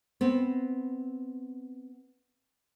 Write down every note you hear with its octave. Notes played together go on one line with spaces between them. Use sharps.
B3 C4